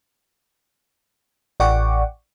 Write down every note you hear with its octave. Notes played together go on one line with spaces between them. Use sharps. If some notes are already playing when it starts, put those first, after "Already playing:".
A1 D5 F#5 G5 C#6 D6